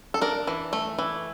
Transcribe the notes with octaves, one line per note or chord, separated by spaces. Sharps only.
A4
D4 A#4
E3
A3
E3